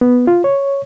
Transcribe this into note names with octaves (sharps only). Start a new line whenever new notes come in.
B3
F4
C#5